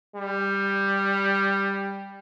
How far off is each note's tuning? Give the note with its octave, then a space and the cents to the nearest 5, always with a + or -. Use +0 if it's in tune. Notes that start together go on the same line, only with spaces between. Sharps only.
G3 +10